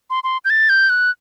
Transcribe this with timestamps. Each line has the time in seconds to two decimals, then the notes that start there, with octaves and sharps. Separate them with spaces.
0.10 C6
0.24 C6
0.45 G6
0.50 A6
0.69 G6
0.90 F#6